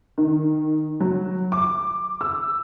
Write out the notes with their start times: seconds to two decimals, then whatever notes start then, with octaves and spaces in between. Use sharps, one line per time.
0.18 D#3
1.00 F#3
1.52 D6
2.21 E6